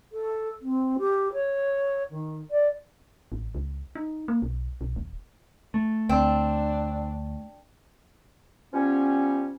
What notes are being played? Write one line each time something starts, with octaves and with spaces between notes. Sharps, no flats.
A4
C4
G4
C#5
D#3
D5
A1
C#2
D#4
A#3
B1
B1
D#1
A3
D2 C4 D4
F3 G3 B3 C#4